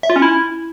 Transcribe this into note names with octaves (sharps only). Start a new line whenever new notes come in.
E5
F4
C#4
E4